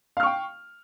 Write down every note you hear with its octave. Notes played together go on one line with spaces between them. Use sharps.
F5 G5 C#6 F6